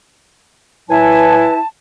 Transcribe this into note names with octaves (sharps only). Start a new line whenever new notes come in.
A2 F#3 E4 B4 G#5 A5